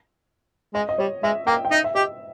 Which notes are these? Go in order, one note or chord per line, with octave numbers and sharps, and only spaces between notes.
G#3 D#5
D#5
G3 C#5
G#3 E5
A#3 G5
G5
D#4 E5
E5
G4 D#5